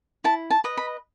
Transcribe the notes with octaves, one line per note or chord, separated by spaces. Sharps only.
E4 A5
A5
B4 D#5
B5